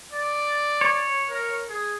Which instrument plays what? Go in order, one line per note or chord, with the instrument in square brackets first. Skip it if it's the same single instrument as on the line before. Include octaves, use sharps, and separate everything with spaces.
[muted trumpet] D5
[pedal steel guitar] C#5
[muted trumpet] A#4
G#4